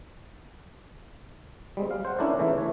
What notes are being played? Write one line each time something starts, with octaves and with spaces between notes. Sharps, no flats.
G3 G#3 C4
F5
C5 F#5
C#4 D4 E4 A4 A#4 D5
C#3 E3 A3 E4
C#5